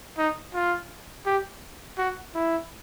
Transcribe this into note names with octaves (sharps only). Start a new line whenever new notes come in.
D#4
F4
G4
F#4
E4